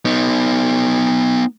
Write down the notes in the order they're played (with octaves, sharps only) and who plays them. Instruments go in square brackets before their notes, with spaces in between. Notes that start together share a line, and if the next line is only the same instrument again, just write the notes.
[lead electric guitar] B3 D#4